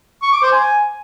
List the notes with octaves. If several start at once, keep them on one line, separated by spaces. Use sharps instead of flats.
C#6
D6
C5
G#5